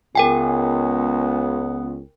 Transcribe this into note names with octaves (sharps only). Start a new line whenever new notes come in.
C#2 B3 A#4 G5 G#5